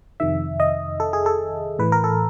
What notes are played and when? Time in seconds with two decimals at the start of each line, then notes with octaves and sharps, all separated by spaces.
0.20 F2 C3 D#3 E5
0.60 D#5
1.00 A4
1.13 G#4
1.26 A4
1.79 A2 E3 B4
1.92 A#4
2.04 A4